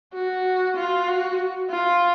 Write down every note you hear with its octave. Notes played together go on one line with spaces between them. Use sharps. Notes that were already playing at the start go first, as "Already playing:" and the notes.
F#4
F4
F#4
F4